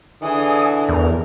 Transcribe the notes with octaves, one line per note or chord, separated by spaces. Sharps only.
D3 E3 G#4 G#5 D#6
E2 A#4